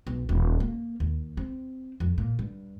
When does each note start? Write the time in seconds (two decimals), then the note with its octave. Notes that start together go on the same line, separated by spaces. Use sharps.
0.07 B1
0.29 D#1
0.60 A#3
1.00 D#2
1.37 C4
2.00 F2
2.18 A#2
2.39 G2